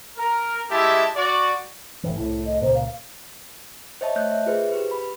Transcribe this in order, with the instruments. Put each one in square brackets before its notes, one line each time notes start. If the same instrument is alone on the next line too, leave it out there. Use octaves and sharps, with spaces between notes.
[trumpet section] A#4
G#3 E4 G4 E5 A5
F#4 D5
[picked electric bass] G1 A2 E3
[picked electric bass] C2 A2 [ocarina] E4
[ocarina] D#5
[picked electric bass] C#2 A#2 [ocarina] C5
[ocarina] F5
[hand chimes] C5 C#5 D#5 E5 A5
A3 D#5 F#6 G6
E5
F4 G#4 B4 C5
G4 B4
B5